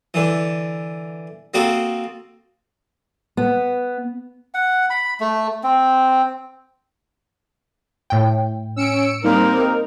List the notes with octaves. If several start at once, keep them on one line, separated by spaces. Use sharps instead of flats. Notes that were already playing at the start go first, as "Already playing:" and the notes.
D3 E3
A#3 C4 F#4 A4 D#5
B3
F#5
B5
A3
C4
A2 G5
C#4 E6 C#7 D7
G3 A#3 C4 D#4 A#4